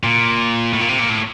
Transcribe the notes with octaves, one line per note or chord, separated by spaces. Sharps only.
A#2
A2
A#2
C3
A#2
A2